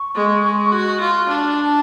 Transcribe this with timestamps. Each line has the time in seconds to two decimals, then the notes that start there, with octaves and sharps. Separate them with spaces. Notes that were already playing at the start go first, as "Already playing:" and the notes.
Already playing: C#6
0.15 G#3
0.44 G#3
0.71 F#4
1.00 F4
1.28 D4
1.56 A5